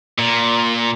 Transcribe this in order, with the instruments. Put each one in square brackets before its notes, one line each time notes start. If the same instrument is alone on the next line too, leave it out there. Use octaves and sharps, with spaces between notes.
[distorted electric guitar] A#2